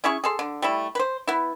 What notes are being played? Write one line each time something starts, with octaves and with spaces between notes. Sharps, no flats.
C#4 E4 G#4 C#6
G#4 A4 C6
D3
G3 A3 E4
B4 C5
B3 E4